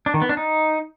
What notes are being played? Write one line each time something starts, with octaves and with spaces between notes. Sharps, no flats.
D4
D#3
B3
D4
D#4